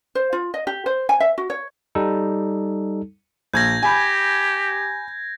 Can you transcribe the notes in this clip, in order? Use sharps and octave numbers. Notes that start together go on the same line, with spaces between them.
C5
F4
D#5
G4
C5
G#5
E5
F#4
C#5
G3 D#4 A4
A#1 G6 G#6 A#6
G4 G#5 B5